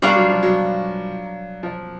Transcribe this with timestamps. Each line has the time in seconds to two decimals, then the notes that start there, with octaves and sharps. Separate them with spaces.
0.02 G3 D4 F4 A#4 C#5
0.16 F#3
0.29 F3
0.43 F#3
1.63 F3